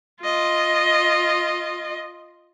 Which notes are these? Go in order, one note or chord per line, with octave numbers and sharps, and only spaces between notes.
F4 D#5